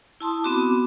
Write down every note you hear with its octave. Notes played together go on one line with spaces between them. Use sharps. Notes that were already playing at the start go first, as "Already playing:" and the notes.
E4 A5 C6 D#6
B3 C4 F#4 D6